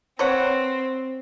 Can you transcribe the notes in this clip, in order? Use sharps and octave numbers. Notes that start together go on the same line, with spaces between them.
C4 B4 C#5 F#5